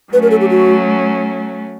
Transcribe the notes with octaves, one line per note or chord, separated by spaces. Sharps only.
F#3 A3 C#4 B4
A#4
A4
G4
F#4